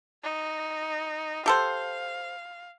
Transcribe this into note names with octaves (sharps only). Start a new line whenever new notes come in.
D#4
G4 A4 C5 F5